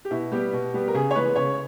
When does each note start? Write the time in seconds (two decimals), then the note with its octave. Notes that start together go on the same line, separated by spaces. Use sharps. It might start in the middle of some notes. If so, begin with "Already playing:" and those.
0.05 G4
0.11 B2 E4
0.32 G3 B3 G4
0.53 B2
0.74 G3 B3
0.88 A#4
0.94 C#3 G#4
1.11 C#5
1.15 E3 G#3 B3 B4
1.36 C#3 C#5